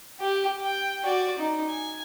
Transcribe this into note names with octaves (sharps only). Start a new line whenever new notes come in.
G4
G5
F#4 D5
D#4
G#5